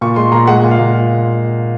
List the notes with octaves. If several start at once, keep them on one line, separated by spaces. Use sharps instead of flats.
A#2 C#6
G#3 C6
A#2 A#5
G#3 F#5
A#2
F5
A#2